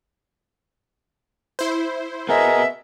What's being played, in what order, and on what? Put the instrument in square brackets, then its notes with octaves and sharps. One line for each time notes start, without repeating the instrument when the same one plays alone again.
[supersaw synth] E4 C5
[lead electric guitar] B3 D#5 [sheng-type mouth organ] G#4 A#4 [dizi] E5